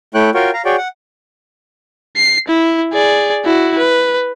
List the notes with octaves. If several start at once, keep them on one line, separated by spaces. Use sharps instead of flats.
A3 E4 C#5 G5 F#6
F4 F#4 A#4 C#5 G5
F5 A#5
F#4 G#4 C#5 D5 G5
F#5
C7
E4
G#4 D5
E4 F#4
B4